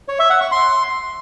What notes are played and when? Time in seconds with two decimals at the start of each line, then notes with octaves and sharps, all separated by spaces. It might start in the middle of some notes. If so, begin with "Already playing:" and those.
0.08 C#5
0.19 E5
0.30 F#5
0.41 C#6
0.52 C6